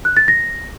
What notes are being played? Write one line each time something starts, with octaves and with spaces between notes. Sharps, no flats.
F#6
A6
A#6